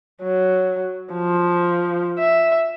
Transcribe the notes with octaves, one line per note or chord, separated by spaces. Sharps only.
F#3
F3
E5